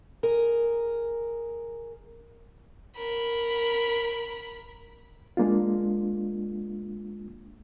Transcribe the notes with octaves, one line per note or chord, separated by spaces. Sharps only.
G#4 A#4
A#4 B5
G#3 A#3 D4 F4